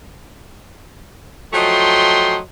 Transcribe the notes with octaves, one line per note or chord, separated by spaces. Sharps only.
F3 F#3 A3 D#5 G5 C6